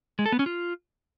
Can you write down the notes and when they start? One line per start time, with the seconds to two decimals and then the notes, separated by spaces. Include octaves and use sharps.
0.19 G#3
0.26 A4
0.32 B3
0.39 C#4
0.46 F4